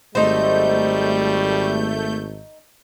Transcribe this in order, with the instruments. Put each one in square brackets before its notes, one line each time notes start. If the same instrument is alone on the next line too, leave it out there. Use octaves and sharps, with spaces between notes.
[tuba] G#1 [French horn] G3 [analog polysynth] A3 G6 [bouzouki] D#4 C5